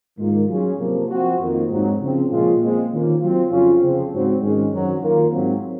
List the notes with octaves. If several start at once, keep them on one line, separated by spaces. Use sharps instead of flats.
G#2 D#3 A#3 F4
F#3 C#4 F4 G#4
C3 F3 A#3
F3 C4 F#4
F2 D#3 A#3 F4
G#2 F#3 C4 D#4
C#3 F3 C4
A#2 F3 G#3 C#4 F4
A#2 G#3 C4
D#3 A#3 C#4 F4
F#3 C4 F4
F2 C#3 F#3 C#4 F4
C#3 F3 C4
G#2 F#3 C4 F#4
G#2 D#3 G#3 C#4
F#2 D#3 F#3 C4
D#3 A#3 F4 A#4
G#2 F#3 C4